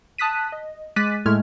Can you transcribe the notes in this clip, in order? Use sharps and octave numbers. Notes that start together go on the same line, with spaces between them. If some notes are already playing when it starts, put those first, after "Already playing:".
A5 D#6 F#6 B6 D#7
D#5
G#3 D6 F#6 A6 B6 D#7
A2 G#3 A3 F6 G#6